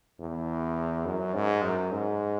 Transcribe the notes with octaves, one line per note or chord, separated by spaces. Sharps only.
E2
F#2
G#2
F#2
G#2